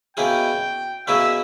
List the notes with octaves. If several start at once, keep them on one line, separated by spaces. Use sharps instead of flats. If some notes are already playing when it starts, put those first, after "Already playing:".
B2 A#3 C#4 E4 G#4 G5
B2 A#3 C#4 E4 G#4 E5